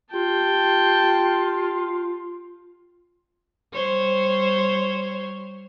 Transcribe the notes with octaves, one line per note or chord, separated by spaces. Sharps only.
F4 G4 G5 A5
G3 C5 C#5